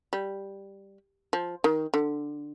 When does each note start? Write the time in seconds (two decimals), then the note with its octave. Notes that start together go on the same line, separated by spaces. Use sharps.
0.13 G3
1.33 F3
1.64 D#3
1.94 D3